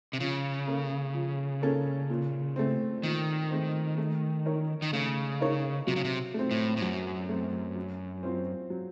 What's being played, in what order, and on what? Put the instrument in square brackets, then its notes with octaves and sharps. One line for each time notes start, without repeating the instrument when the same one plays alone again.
[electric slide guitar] C3
[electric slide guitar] C#3 [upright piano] F3
[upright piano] A#3 C#4 A4
F3
A#3 C#4 A4
A#2
A3 C4
[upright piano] A#2 [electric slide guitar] D#3
[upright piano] A3 C4
A3
D#4 A#4 C#5
[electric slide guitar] D#3
[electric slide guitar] C#3 [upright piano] A3
[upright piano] D#4 A#4 C#5
[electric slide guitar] C3 [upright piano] F#3
[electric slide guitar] C#3
C3
[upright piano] A3 C4
[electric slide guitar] A2
A2
[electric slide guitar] F#2 [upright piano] F#3
[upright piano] A3 C4
F#3
C4 F4 C5
F#3